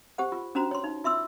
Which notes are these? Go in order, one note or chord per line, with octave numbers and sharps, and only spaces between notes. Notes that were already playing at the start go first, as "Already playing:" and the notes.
G4 C5 F#5
F4
C#4 D4 F#4 C5 A#5
C#5 C6
D#4
F4 E5 C6 E6